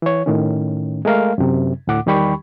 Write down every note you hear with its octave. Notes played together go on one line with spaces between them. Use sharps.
E3 C#5
A2 D#3 C#4
G#3 A3 A#4 F5
F#2 C3
D2 A2 F#5 D6
E2 D#3 G3 G4 B5 C#6